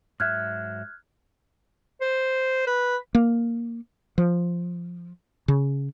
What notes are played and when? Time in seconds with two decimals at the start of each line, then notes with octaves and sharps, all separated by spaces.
0.20 G#2 F#3 E5 F6 F#6 G#6
2.01 C5
2.67 B4
3.15 A#3
4.18 F3
5.48 C#3